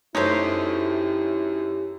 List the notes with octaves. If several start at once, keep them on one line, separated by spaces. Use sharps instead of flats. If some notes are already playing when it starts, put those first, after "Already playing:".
F#2 A3 D#4 E4 G4 A4 C5 C#5